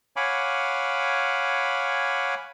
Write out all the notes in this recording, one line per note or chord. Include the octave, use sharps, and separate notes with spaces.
C#5 F5 F#5 G#5 B5 D6